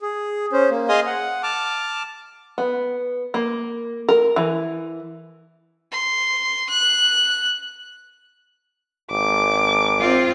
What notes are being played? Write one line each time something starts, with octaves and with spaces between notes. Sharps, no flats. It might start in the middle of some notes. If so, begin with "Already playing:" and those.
G#4
C#4 C5
A#3
G#4 D#5 F5 G#5 C6 D#6
F#5
A5 D6 F6
B3
A#3
A#4
E3
C6
F#6
G#1 D6
C4 F4